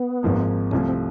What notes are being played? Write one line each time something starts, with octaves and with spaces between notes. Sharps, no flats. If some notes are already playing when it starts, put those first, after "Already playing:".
Already playing: B3
G#1 G#2 F3 A#3
C2 C3 F3 A3 C#4
C4